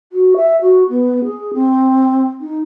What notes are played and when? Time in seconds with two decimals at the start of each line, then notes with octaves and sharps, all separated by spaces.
0.12 F#4
0.37 E5
0.61 F#4
0.90 B3
1.25 G#4
1.54 C4
2.41 D#4